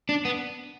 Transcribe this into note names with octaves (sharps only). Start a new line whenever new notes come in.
D4
B3